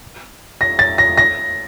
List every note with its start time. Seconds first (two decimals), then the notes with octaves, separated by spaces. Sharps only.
0.61 A#6
0.79 A6
0.98 A#6
1.18 A#6